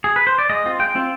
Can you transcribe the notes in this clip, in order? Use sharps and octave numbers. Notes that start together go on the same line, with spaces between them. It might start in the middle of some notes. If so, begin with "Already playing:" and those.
G#4
B4
C5
D5
G#3 D#5
C4 F4
G#3 G5
C4 F4